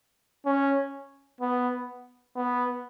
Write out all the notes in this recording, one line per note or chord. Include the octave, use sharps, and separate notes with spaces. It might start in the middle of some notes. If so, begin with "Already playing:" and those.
C#4
B3
B3